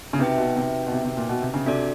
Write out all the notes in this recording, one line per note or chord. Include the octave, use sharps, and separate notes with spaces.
C#3
C3 D#4 F#4 B4 E5 G5
B2
C3
B2
C3
C3
A#2
B2
C3
C#3
C3 D4 F#4 A4 D5